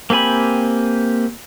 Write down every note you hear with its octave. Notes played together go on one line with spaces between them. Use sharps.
A#3 C4 G4 G#5 B5